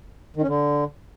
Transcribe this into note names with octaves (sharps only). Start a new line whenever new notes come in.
D#3
C#4
D3